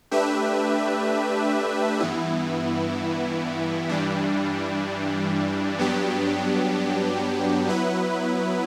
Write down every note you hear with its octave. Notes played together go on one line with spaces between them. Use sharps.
A3 D4 G4 B4 E5
G2 E3 B3 E4
G2 E3 G3 D4
G2 F#3 B3 D4 G4
F#3 B3 E4 B4